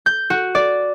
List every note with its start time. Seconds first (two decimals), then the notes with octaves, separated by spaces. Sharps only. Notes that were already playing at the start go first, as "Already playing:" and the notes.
0.06 G6
0.30 F#4
0.55 D5